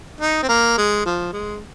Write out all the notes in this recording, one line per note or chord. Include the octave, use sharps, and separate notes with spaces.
D#4
C4
A#3
G#3
F3
G#3